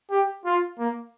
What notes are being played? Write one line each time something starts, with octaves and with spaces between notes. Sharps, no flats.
G4
F4
A#3